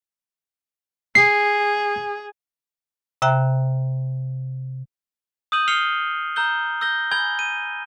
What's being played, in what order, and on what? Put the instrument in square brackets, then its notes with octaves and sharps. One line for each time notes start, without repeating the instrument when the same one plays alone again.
[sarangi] G#4 [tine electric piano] C7
[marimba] C3 E5 G5 A#5 F#6
[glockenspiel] D#6 E6 G6 D#7 F#7
F6 C7 C#7 F7 G7
A#5 E6 G6 G7
E6 G6 A#6 G7
G#5 B5 E6 G6 G#6 G7
D#7